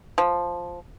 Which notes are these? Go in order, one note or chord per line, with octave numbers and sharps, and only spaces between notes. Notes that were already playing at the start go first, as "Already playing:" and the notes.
F3